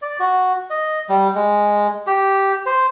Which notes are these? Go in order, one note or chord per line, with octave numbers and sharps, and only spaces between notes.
D5
F#4
D#5
G3
G#3
G4
C5